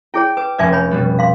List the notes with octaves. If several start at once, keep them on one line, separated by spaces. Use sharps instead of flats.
E4 G#4 C#5 G5
B4 D6
F1 C#4 B4 E5 G#5 G#6
C#5 G#5 B5
B2 G3 B3
F5 C6